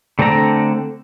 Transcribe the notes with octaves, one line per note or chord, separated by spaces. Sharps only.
D3 A3 C4 D4 A#5